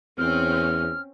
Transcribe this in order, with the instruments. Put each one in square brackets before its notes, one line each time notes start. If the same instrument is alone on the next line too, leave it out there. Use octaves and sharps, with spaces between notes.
[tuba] E2 [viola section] C4 C#4 [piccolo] F6